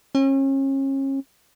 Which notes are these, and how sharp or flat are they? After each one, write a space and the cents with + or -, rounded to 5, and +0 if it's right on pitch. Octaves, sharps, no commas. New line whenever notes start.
C#4 -35